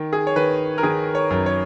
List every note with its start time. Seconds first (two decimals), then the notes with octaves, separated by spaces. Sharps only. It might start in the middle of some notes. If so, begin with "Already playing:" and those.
Already playing: D#3
0.13 G#4
0.27 C#5
0.36 D#3 B4
0.78 A#4
0.83 D#3 G#4
1.15 C#5
1.30 F#2
1.46 C#5